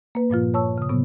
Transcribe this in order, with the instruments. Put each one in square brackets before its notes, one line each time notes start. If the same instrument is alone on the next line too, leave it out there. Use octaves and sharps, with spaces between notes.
[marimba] A#3 B4
G2 A#2 F3 F4
C#5 A5 C#6 E6
C#3 D#6
A2 C3 F#3 B3